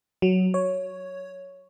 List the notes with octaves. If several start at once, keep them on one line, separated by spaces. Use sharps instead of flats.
F#3
C#5